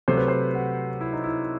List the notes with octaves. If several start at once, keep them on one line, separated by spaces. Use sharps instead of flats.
C3 F#3 A3 C5
B4
C5
F#4
E4
D#4
E4